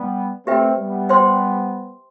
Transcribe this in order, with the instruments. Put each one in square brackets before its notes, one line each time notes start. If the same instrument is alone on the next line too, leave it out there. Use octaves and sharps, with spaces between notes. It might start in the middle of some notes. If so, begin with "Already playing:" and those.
Already playing: [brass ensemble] G3 B3
[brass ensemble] A3 C4 [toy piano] G4 B4 E5 G5
[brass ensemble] G3 B3
[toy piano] C5 G5 C6